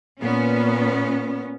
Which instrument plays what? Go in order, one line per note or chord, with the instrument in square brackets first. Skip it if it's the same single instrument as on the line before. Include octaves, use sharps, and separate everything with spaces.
[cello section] A#2 B3 C#4